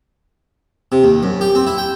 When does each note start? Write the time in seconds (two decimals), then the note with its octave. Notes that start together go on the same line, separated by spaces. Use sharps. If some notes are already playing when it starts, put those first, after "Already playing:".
0.92 C3
1.04 D#2
1.23 F#2
1.41 G4
1.55 C4
1.67 E4
1.78 G5